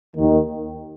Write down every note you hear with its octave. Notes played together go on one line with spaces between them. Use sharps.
D#2 D#3